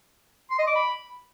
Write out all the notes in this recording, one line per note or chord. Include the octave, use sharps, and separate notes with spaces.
C6
D#5
D6
B5